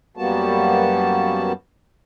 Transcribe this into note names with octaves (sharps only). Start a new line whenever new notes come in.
F#2 G3 A#3 B3 F#4 A5